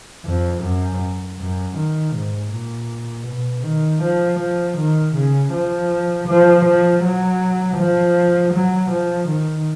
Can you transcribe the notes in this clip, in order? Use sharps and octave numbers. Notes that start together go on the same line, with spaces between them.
F2
F#2
F#2
D#3
G#2
A#2
B2
D#3
F3
F3
D#3
C#3
F3
F3
F3
F#3
F3
F#3
F3
D#3